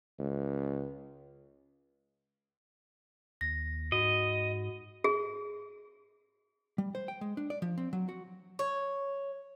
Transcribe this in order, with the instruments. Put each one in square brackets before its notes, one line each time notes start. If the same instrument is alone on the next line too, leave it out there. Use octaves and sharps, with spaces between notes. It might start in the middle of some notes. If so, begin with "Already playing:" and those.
[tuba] C#2
[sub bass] D#2 [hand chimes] A#6
[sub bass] G#2 [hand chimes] F#4 [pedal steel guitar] D#5
[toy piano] G#4
[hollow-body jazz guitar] G3
C5
G5
G#3
D4
D5
F3
C4
F#3
F#4
[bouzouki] C#5